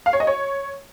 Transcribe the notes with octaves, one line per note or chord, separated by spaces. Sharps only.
F5
C#5
D#5
C#5